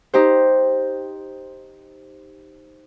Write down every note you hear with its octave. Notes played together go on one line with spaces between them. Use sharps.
D#4 G4 C5